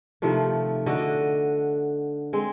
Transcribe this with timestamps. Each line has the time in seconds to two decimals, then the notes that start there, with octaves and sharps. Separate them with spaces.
0.22 C3 D#3 F3 A3
0.86 D3 F#4 D#5
2.33 G#3 C4